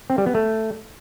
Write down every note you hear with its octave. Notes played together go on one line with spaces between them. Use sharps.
C4
G3
B3
A3